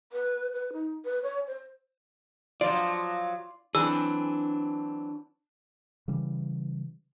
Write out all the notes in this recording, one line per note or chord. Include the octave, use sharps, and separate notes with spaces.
B4
B4
D#4
B4
C#5
C5
F3 F#3 F4 D5
E3 F#3 C4 D4 G#4 E6
C#3 E3 G3